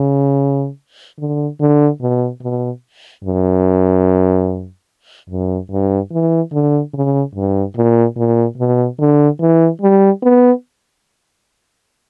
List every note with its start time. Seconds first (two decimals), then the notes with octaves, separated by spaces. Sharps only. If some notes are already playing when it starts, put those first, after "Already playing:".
Already playing: C#3
1.19 D3
1.60 D3
2.01 B2
2.42 B2
3.24 F#2
5.30 F#2
5.71 G2
6.12 E3
6.52 D3
6.93 C#3
7.35 G2
7.76 A#2
8.17 A#2
8.58 B2
9.00 D3
9.40 E3
9.82 G3
10.23 B3